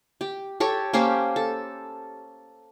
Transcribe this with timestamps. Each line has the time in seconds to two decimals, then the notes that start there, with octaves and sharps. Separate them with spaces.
0.21 G4
0.60 G4 A4 C#5
0.93 A#3 C#4 G4 C5
1.36 A4